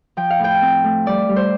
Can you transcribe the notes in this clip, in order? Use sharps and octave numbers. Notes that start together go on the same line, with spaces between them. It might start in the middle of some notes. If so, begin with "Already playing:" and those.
F3 G5
F5
A2 G5
C4
A3
G3 D5
G3
C5